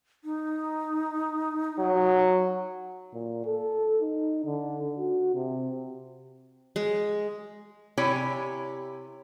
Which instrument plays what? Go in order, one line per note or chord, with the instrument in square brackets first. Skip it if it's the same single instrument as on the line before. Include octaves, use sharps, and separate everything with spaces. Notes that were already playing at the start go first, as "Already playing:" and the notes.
[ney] D#4
[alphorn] F#3
[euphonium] A#2
A4
D#4
D3
F#4
C3
[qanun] G#3
[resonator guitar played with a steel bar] C3 E4 G4 C#5 G#5